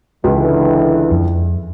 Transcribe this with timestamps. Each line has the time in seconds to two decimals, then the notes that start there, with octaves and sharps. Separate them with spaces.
0.24 C#2 D3 E3
1.11 F2